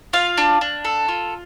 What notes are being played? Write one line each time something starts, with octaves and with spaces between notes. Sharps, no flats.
F4 F5
D4
D4
A4
F4